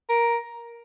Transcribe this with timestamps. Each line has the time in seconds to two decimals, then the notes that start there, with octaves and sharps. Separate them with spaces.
0.09 A#4